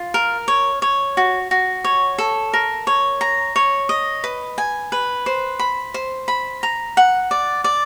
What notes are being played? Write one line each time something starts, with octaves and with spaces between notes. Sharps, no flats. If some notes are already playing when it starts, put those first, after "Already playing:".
Already playing: F4
A#4
C#5
C#5
F#4
F#4
C#5
A4
A#4
C#5
A#5
C#5
D#5
B4
G#5
B4
C5
B5
C5
B5
A#5
F#5
D5
D5